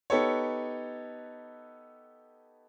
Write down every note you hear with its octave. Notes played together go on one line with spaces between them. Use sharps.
B3 D#4 G4 A4 B4 C#5